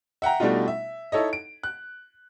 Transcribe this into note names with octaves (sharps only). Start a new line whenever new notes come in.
E5 F#5 G5 A#5
B2 G3 A3 D4 D#4 F4
E5
D#4 E4 A4 C#5 D#5
D7
F#6